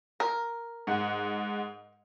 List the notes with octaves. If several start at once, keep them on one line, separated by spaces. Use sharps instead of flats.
A#4
G#2 F#5